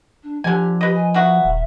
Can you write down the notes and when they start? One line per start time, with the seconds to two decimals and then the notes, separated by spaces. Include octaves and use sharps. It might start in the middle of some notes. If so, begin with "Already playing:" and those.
0.23 D4
0.44 D3 F3 G4 G#5
0.81 G4 B4 D#5
0.95 G#5
1.14 F#3 B3 F#4 E5
1.44 D#1